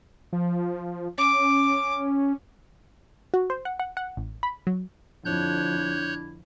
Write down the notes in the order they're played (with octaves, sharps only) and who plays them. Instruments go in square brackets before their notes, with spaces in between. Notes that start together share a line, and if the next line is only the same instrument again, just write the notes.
[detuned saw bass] F3
[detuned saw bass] C#4 [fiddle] D6
[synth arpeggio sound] F#4
C5
F#5
F#5
F#5
A1
B5
F#3
[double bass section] F2 D3 [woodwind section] D4 E4 [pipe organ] C#5 F#6 G6